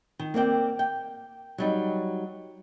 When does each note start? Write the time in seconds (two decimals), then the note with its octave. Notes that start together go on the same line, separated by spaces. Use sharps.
0.19 D#3
0.34 A#3 C4 D5 G5
0.79 G5
1.58 F#3 G3 D#4